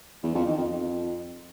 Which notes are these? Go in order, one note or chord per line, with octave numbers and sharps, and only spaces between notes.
E2
F2
D#3
F2
F2